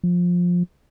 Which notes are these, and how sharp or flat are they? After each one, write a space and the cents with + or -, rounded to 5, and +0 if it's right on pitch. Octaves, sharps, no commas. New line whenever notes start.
F3 +15